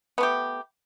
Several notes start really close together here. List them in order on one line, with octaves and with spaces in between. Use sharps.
B3 A3 G4